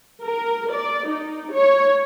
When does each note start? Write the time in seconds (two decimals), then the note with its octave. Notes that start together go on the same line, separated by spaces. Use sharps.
0.23 A#4
0.71 D5
1.07 D#4
1.52 C#5